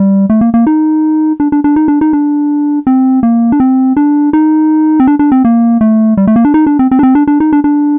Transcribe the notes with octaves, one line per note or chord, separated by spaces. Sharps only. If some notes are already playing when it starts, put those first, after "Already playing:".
Already playing: G3
A3
A#3
A#3
D#4
D4
D4
D4
D#4
D4
D#4
D4
C4
A#3
D4
C4
D4
D#4
C4
D4
D4
C4
A#3
A3
G3
A3
A#3
D4
D#4
D4
C4
C4
D4
C4
D4
D4
D#4
D4
D4